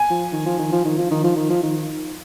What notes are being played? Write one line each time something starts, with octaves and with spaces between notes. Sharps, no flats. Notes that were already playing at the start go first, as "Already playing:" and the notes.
Already playing: G#5
F3
D#3
F3
D#3
F3
D#3
F3
D#3
F3
D#3
F3
D#3